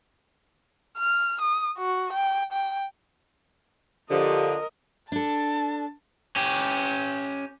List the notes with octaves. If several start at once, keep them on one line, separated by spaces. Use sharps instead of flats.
F6
D#6
F#4
G5
G5
D3 F3 G4 A#4 D#5
D4 A4 A5
C#4 G4